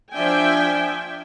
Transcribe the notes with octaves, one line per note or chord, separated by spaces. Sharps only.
F3 D4 E5 G5 G#5